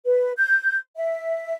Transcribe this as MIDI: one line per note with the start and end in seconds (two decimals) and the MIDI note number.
0.04 0.32 71
0.37 0.76 91
0.95 1.57 76